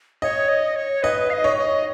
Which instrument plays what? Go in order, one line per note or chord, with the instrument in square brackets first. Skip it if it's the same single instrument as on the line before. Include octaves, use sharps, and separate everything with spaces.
[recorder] C#5 [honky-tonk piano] D#5
[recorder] D#5
C#5
[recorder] B4 [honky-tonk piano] D#5
[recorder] F5
D#5
[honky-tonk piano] C#5
[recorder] D#5